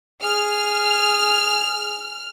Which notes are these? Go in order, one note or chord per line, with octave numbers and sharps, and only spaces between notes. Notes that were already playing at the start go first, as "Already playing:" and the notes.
G#4 F6